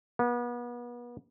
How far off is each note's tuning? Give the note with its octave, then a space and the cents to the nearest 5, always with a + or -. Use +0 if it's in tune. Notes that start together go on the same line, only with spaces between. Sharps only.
B3 -35